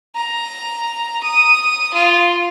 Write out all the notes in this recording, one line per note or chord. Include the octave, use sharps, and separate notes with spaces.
A#5
D#6
F4